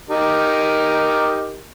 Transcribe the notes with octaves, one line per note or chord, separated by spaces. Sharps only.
D#4 G4 A#4